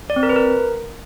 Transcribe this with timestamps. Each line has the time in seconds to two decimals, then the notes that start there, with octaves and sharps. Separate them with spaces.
0.10 D5
0.16 C4
0.23 A#4
0.29 B4
0.36 A#4